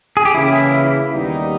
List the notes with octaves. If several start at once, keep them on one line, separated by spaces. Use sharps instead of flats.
G#4
G4
C#3 E3 A#3 E4
D#2 D#3 G3 B3 D#4